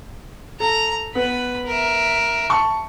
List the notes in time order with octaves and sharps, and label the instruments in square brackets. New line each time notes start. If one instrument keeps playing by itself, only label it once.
[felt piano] A4 [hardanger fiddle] A#5
[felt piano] B3 [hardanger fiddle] B4 B5
[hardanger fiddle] A#4 E5
[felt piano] A5 C#6